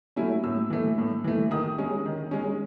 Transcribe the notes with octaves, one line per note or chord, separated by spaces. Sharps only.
F#3 A3 C#4 E4
A2 E6
E3 A3
A2
E3 A3
D#3 D#6
G#3 C#4
D#3
G#3 C#4